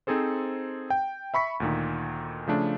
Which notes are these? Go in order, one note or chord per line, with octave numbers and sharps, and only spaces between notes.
C4 D#4 G#4 A4 C5
G5
E5 B5 C#6 B6
D2 A#2 D#3
C#3 F3 A3 D4